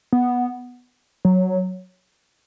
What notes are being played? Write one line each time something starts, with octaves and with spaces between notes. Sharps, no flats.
B3
F#3